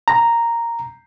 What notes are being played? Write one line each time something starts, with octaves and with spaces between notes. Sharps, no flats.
A#5